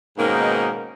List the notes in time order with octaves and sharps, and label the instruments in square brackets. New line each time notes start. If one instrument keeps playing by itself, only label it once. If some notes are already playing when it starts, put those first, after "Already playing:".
[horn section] G#2 B2 D#3 A#3 C#4 D#4